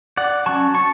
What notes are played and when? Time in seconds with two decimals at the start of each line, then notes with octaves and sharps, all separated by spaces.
0.17 D5 F#5
0.46 F#3 C#4 A5 C#6
0.75 A5 C#6